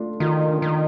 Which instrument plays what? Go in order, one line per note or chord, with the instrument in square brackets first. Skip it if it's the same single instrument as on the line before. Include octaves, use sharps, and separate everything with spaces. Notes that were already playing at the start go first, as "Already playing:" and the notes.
Already playing: [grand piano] A3 D4 F4
[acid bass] D#3 [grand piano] F4
[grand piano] D4
[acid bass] D#3